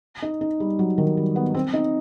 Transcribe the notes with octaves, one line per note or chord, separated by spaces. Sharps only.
D#4
D#4
G3
F#3
D#3
G3
B3
C4
D#4